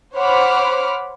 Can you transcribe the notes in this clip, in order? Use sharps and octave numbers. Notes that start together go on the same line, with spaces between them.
C5 C#5 F#5 B5 D6 F6